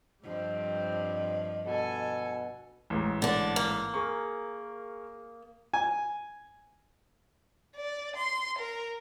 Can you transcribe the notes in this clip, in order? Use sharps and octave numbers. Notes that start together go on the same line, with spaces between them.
G2 F3 G3 C4 D#5
B2 A4 G#5
A1 G#2
D3 D4
A#3
G#4 A#4 C#6
G#5
D5
C6
A#4